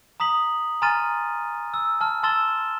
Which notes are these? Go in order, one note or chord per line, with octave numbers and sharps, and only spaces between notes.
A#5 D#6 B6 F#7
G#5 A#5 C6 F6 A6 D#7
E6
A5 F6
A5 C6 E6 A6 E7 G7